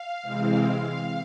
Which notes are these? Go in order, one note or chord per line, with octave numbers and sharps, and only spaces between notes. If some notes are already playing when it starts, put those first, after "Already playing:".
Already playing: F5
C3 E3 G#3 C4
F5